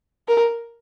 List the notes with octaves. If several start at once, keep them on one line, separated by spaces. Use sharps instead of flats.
A#4